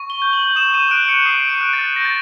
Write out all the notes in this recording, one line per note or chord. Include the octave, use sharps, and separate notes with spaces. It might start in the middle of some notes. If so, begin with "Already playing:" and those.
Already playing: C#6
G7
G6
F#7
D#6 E7
D#7
F#6 D7
C#7
D#6 C7
D7
F#6
A6
G6 A#6
A6